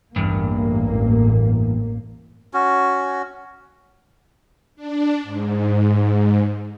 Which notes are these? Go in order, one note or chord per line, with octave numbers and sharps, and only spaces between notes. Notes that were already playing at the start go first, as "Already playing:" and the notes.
A1 E2 G2 A#3
C#4 F#4
D4
G#2